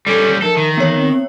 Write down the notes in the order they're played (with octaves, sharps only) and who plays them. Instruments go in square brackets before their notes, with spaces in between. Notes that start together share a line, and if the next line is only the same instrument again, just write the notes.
[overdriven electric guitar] G3 C#4 [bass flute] A4
[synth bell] F3 [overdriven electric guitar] A4 [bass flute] A#4
[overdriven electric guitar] D#3
[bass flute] E3 [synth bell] B3 C#5
[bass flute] C4